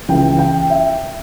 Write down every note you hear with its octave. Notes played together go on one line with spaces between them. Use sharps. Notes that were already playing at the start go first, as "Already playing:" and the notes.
C#2 C#3 E3 G5
G5
E5